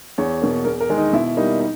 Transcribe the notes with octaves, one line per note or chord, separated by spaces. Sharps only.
E2 C#5
B2 A#3
E2 A#4
A#4
D#3 G#3
D#4
B2 E4
G3 A#3 D#4
D#4